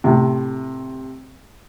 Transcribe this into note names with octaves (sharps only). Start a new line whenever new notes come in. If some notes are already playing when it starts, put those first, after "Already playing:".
A2 C3